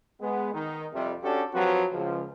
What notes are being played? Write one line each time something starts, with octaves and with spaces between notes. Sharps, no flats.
G#3 B3
D#3 D#4
F2 C3 G3
C#4 D4 F#4 G4 A4
F3 F#3 C4 F#4 G4 B4
C#2 F3